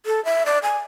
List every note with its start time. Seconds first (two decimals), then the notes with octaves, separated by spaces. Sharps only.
0.06 A4
0.25 E5
0.46 D5
0.63 G#5